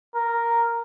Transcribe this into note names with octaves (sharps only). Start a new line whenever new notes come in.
A#4